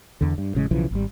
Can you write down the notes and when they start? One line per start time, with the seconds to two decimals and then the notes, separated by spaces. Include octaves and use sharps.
0.21 E2 D3
0.38 G2
0.55 A1 C#3 G#3
0.71 B1 C#3 E3 F3
0.91 G#1 G3